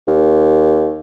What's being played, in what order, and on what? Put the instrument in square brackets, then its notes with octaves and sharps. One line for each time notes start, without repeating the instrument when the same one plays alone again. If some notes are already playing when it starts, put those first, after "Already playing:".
[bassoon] D#2